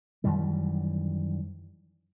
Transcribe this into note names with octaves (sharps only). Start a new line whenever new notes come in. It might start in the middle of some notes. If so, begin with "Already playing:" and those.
F#2 D#3 E3 G3